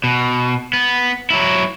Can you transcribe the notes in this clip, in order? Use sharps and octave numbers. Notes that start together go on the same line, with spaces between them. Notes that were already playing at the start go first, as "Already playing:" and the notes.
B2
B3
F#3 E4